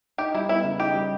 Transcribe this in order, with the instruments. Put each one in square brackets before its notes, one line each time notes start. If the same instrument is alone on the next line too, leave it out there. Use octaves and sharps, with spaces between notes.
[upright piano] D#4 [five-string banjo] G4
[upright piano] G3 [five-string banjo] E4
[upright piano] B3 [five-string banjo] E4
[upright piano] C#3
[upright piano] D#4 [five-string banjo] G4
[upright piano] G3